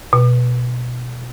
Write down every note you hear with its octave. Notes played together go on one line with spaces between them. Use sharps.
B2